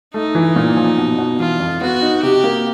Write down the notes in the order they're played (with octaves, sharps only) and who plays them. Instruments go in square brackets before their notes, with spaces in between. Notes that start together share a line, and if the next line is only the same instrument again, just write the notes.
[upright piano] A3 [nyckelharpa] D#4
[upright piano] E3
A#2
F3
B2
B2
[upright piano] E3 [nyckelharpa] F4
[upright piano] F2
[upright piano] B3 [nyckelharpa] F#4
[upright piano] D#4
[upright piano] C3 [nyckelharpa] G4
[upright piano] A#3